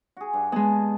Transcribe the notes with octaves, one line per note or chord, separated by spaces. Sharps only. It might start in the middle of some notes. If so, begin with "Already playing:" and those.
F#4 G#4
G2
G#3 B3 D#5 G#5 A5